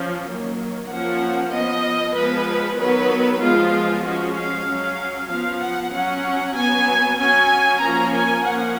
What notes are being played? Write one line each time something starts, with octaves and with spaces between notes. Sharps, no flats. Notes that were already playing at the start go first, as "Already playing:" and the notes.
Already playing: F3 C#4
D#3 F#3 A#3
F3 A#3 C#4 F#5
F3 B3 D#5
F3 G#3 B3 B4
D#3 F#3 B3 B4
F3 G#3 B3 F4
F3 G#3 C#4 F#4
F5
F#3 C#4
F3 B3 F5
F#5
F#3 C#4 F#5
F#3 B3 G#5
F#3 C#4 G#5
F3 A#3 C#4 A#5
G#5
F3 A#3 C#4 F#5